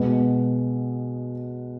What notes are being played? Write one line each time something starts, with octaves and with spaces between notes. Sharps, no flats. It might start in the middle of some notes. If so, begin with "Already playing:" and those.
Already playing: B2 G#3 B3